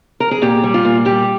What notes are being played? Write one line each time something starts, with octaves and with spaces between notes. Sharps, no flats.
A#4
G#4
A#2 G4
G3
F4
A#2
G3 G4